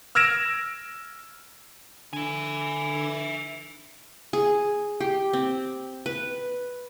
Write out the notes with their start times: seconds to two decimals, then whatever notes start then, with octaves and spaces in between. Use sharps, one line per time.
0.15 E6 F6 G#6 A#6 D7 E7
2.13 D3 E5 G#5
4.33 G#4
5.00 G4
5.33 C4
6.06 B4